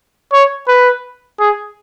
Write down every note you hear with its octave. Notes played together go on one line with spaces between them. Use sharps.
C#5
B4
G#4